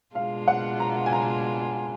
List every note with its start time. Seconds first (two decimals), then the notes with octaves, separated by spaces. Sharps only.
0.15 B2 G#3 D4 F4 F5
0.48 F#5
0.80 A#5
1.06 G#5
1.13 A#5